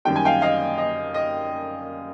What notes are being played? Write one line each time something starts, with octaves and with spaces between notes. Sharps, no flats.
F#2 D#3 G3 G5
G#5
F5 G5
D#5 F5
D#5
D#5